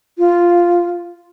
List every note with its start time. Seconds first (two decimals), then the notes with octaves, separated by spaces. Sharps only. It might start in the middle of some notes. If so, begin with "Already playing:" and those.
0.18 F4